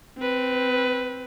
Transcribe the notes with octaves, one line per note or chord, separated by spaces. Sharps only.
C4 B4